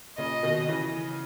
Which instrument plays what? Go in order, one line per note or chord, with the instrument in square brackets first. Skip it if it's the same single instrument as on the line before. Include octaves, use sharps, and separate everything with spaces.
[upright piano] A#2 C#3 [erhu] D#5
[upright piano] B2 D#3
C#3 E3